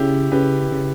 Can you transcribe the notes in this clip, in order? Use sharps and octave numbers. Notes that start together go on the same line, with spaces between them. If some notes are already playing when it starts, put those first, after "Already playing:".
Already playing: C#3 E4 G4
C#3 G4 B4
C#3